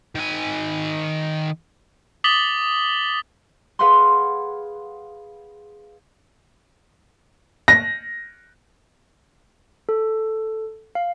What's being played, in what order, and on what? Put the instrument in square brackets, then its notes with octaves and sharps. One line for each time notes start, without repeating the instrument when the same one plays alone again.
[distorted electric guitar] D#3 G#5
[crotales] D6 D#6 A6 B6 F#7 G7
[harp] G#4 B4 F5 F#5 C6
[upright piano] A#6
[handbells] A4
F5